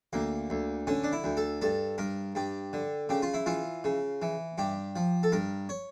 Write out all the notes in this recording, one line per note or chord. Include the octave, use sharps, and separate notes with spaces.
D2 A#3
D2
D3 C#4
D4
E4
D2
A4
G2 A4
G2 A#4
G2 G4
D3
C#3 G4
F4
E4
E3 F4
C#3
E3
G2 G4
F3
A4
G2 A#4
C#5